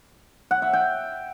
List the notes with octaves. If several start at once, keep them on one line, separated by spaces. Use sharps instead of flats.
F#5
E5
G5